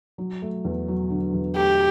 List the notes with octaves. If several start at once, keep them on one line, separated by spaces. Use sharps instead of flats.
F#3
A3
E2
F#3
D3
E2
A3 G4